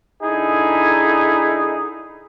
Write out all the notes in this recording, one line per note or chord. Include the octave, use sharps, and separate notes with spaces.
D3 D#4 E4 G#4